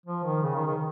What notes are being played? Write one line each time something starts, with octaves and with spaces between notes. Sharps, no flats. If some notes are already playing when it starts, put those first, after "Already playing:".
F3
D#3
C#3
D#3
D#3